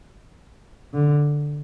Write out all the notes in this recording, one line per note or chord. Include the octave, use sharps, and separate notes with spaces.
D3